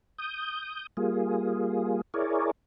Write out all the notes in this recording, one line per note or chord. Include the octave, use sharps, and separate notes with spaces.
D#6 G6
G3 A#3 F4 G#4
E4 G#4 A#4 C#5 D5